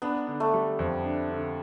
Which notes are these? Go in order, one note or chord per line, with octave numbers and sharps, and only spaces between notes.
B3 D4
D3
A3
G3
F2
D4
D3